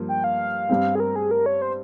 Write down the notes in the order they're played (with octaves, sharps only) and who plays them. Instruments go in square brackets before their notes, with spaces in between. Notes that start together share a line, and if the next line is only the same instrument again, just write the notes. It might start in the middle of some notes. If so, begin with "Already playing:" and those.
Already playing: [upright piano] G2 F3 A#3
[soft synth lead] G5
F5
[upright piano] G2 G3 C4
[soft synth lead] G#4
A#4
G#4
A#4
C#5
C5